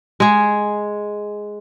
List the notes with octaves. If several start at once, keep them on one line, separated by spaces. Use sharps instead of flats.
G#3 G#4